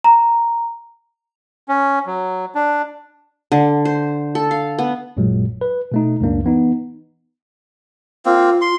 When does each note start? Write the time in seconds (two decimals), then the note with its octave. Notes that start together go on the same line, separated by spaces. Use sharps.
0.04 A#5
1.68 C#4
2.06 F#3
2.55 D4
3.52 D3
3.85 C5
4.35 A4
4.51 F5
4.79 B3
5.17 A1 F#2 A#2 F#3 G#3
5.61 B4
5.92 B2 A3 D#4
6.21 C#2 F#2 A#3 D4
6.44 E3 B3 D#4
8.26 A#3 C4 F4
8.61 C6